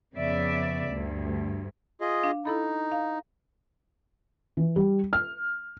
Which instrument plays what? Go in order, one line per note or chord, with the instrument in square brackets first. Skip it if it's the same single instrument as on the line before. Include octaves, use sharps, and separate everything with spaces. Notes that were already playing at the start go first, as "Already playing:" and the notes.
[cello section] F2 C#3 B3 D5 E5
D2 G2
[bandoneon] F4 G#4 D#5
[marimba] D4 F5
[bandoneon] D#4 [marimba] E4 A4 B5
[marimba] F5
[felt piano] E3
G3
F6